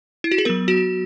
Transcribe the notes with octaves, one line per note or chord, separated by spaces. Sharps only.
E4
F#4
G#4
F#3 B3 A#4
F#4